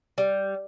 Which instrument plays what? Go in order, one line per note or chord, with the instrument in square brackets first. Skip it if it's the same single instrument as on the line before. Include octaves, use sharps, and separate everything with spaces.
[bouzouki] G3